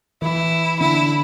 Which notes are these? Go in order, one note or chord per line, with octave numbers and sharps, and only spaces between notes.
E3 E4
D3 E4